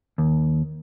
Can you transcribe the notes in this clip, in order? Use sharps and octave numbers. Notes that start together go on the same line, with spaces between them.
D#2